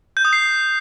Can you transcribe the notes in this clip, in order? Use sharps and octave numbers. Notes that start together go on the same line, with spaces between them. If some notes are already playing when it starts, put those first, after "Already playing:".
G6
D#6
C7